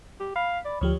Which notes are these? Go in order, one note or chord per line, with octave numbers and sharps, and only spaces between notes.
G4
F5 B5
D5
D2 F3 G4 C#5